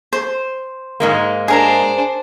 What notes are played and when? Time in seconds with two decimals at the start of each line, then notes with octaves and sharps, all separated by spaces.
0.13 C5
1.00 G#2 G#3 A#3
1.48 D4 G#4 A#4 C5 A#5